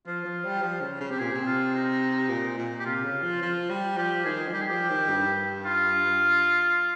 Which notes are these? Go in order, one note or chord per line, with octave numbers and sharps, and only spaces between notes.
F3 F4
F3
G3
F3
C#3
C#3
C3 G4
A#2 G#4
C3
F4
D#4
A#2
A#2
G4
C3 F4
C#3
F3
F3
G3
F3 G4
D#3 G#4
F3
G3 G4
G#4
F3 G4
D#3
G2
F4